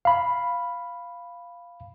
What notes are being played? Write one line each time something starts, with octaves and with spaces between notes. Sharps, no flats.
F5 B5